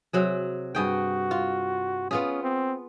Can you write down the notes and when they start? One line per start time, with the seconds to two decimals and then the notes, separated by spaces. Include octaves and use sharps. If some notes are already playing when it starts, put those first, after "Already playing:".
0.13 C3 F#3 G#4
0.75 G2 F#4 G#4 G5
1.31 F4
2.11 B3 C#4 F4 G#4
2.43 C4